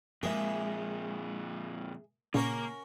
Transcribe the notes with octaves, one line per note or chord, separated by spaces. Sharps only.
F2 A#2 G#3 A#3 G#4 E5
A#2 C#3 A#3 C#4 F#4 A#4 A#5